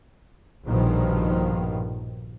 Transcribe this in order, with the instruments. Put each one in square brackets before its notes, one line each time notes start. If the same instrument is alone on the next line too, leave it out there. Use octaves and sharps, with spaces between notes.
[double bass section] A#1 G2 B2 D#3 F3